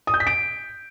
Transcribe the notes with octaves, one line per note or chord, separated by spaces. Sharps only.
D#6
G6
B6
D7